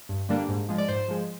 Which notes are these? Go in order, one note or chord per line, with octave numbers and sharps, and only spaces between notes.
G2
D3 G3 A#3 D4
G#2
F3 G#3
D5
G#2 C5
F3 G#3